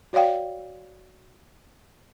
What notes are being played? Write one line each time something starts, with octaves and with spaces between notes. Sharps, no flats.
F#4 C#5 D5 F5 G5